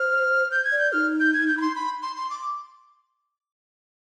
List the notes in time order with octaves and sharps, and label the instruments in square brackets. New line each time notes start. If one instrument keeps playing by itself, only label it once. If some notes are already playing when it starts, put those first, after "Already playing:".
Already playing: [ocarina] C5 [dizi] F6
[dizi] G6
G#6
[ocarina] D5
[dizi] G6
[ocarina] D#4 [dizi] F6
[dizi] G6
G#6
G6
B5
C6
B5
C6
C6
D6